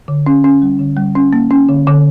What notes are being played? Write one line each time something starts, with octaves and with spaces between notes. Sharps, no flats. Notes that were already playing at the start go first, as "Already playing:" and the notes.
D3
C#4
C#4
G3
D3
G3
C#4
A#3
C#4
D3
D3